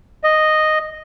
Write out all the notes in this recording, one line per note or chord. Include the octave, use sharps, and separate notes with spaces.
D#5